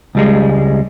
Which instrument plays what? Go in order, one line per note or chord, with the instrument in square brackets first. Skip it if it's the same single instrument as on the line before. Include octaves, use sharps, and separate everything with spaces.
[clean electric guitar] C#2 G3 G#3